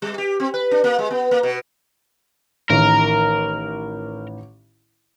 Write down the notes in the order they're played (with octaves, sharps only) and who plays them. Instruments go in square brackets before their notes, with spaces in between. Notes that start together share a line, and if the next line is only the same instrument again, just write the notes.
[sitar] G3
G4
C4
B4
D4
A#3
G#3
B3
A#3
B2
[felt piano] A1 D#3 [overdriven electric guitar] A#4